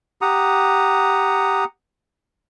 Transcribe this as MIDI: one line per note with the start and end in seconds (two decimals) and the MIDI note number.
0.21 1.64 67
0.21 1.64 78
0.21 1.64 82
0.21 1.64 87